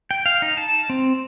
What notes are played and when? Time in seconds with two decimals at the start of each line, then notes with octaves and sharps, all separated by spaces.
0.11 G5
0.26 F5
0.42 D#4
0.57 A5
0.90 C4